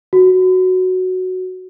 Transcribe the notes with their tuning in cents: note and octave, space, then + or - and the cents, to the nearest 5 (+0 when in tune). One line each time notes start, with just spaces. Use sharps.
F#4 +0